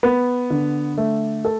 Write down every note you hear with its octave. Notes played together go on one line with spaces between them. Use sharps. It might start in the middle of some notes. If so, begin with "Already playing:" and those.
B3
D3
A3
A4